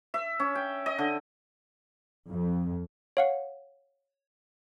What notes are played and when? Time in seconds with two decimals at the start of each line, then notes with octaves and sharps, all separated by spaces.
0.14 E5
0.40 C#4
0.55 G5
0.86 D#5
0.98 D3
2.30 F2
3.17 C#5 F5 F#5